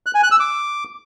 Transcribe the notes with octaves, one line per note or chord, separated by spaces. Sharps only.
F#6
G#5
F#6
E6
D6